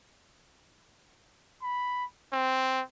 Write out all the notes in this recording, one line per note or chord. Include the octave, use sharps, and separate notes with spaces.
B5
C4